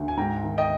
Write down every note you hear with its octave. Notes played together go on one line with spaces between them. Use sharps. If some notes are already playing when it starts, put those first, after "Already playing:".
Already playing: D2
G#5
G#2 G5 A#5
D#3
D#5 G5